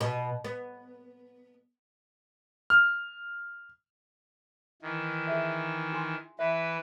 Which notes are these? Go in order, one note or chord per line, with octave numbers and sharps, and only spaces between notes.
B2
B3
F6
D#3 E3
G#4 E5
F4 G#5 C6
E3 B4 E5